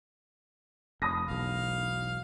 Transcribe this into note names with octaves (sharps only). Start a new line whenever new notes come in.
F1 B5 D#6 A#6
E1 B1 F5